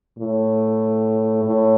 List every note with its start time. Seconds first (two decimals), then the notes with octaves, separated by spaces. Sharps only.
0.19 A2
1.45 A2